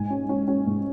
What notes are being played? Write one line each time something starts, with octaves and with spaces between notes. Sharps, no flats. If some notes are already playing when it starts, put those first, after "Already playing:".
Already playing: G#2 G#5
C#4
C#4
C#4
G#2